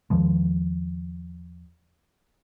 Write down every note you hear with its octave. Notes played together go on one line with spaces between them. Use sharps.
E2 D#3 F3 G#3